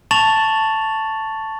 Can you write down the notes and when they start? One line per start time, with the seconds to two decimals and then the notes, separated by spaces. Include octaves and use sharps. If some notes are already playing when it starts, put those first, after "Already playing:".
0.11 A5 C#6 A6 F7 F#7